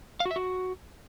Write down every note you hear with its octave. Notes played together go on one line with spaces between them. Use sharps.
F5
F#4
E5
F#4